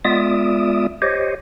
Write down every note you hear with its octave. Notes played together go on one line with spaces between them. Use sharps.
G#3 B3 F4 D5 E5 D#6
G4 C5 C#5 D#5